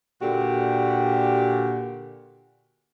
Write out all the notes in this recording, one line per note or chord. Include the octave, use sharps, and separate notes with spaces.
A#2 D3 F#4 G4